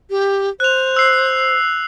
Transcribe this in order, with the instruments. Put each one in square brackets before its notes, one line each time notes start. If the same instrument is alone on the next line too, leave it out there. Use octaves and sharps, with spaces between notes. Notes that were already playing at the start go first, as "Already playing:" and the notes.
[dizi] G4
[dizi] C5 [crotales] F#6 F7
[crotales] E6 C7